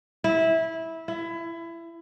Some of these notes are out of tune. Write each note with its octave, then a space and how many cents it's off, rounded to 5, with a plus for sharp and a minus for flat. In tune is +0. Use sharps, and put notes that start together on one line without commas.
E4 -15
E4 +25